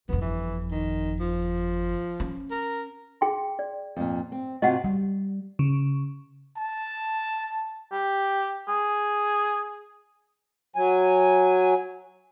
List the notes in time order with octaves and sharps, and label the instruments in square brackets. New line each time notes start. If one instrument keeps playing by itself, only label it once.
[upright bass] G1 F2 [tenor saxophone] B3
[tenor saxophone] E3
D#3
F3
[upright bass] C#4
[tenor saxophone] A#4
[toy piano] G#4 G5 C6
D5
[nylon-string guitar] F2 A#2
C4
[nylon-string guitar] C3 F4 F#4 [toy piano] D#5 F#5
[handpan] G3
[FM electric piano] C#3
[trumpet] A5
[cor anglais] G4
G#4
[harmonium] F#3 G#5